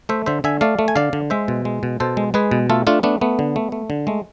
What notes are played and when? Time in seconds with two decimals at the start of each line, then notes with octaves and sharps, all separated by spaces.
0.09 A3 C5 E5
0.26 D3 C5 E5
0.44 D3 E5 G#5
0.61 A3 D5 F5
0.79 A3
0.88 G#5
0.96 D3 D5 F5
1.13 D3
1.30 G#3 C5 E5
1.48 B2
1.65 G#3
1.83 B2
2.00 B2 A4 C5
2.17 G#3
2.34 G#3 G#4 B4
2.51 B2
2.70 A3 F4 A4
2.87 A3 D4 F4
3.03 A3 B3 D4
3.21 A3 B3
3.39 D3
3.56 A3
3.72 A3
3.90 D3
4.07 G#3 A3